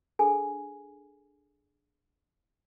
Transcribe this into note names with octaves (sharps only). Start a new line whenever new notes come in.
D4 G#4 A4 G#5